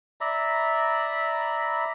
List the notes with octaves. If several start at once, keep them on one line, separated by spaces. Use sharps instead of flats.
D5 E5 A#5 B5